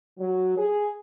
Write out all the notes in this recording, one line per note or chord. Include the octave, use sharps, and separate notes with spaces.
F#3
G#4